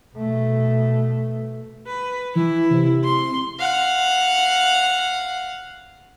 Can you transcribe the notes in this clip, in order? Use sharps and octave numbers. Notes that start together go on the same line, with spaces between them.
B2 A3
B4
E3 E4
C3
C6
F5 F#5